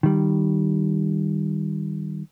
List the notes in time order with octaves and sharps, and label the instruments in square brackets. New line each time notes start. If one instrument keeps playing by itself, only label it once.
[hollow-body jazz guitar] D#3 G3